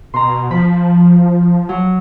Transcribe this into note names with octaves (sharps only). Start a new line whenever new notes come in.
B2 A#5 C6
F3 B5
F#3